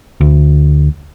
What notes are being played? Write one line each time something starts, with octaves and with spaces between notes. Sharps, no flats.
D2